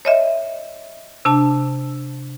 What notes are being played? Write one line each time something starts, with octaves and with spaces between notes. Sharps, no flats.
C#5 D#5 E5
C3 D4 A5